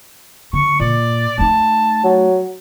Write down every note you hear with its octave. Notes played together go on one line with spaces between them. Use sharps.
D3 C#6
A#2 D5
A3 D#4 A5
F#3